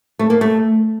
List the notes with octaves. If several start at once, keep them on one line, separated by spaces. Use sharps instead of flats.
A3
A#3
A3